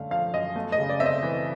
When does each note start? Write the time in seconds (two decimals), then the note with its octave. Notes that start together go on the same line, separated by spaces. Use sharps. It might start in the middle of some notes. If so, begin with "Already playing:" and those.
Already playing: F#2 D3 A3 F5
0.11 F3 F5
0.34 F#2 D#5
0.56 A3
0.72 D#5
0.78 C#3
0.89 D5
1.00 C4 E5
1.06 D#5
1.23 E3